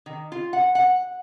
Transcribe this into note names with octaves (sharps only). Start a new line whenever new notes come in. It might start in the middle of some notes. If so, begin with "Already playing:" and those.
D#3
F4
F#5
F#5